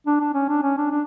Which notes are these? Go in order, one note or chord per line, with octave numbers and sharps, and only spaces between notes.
D4
D4
C#4
D4
C#4
D4
D4